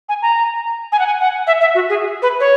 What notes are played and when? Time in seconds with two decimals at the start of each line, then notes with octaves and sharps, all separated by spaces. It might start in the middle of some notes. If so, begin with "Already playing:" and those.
0.09 G#5
0.22 A#5
0.92 G#5
0.99 F#5
1.06 G#5
1.20 F#5
1.47 E5
1.61 E5
1.75 F#4
1.89 G#4
2.22 B4
2.40 C#5